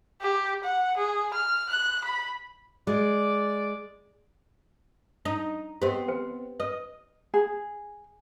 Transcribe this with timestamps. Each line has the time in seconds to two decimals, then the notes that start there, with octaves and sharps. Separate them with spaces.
0.21 G4
0.63 F#5
0.97 G#4
1.33 F6
1.69 F#6
2.04 B5
2.87 G#3 D5
5.25 D#4
5.82 B3 C4 G4 C5 D#5
6.08 B4 C5 G5
6.60 B4 D#5
7.34 G#4